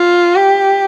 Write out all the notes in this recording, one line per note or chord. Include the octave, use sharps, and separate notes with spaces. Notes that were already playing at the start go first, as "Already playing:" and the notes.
Already playing: F4
G4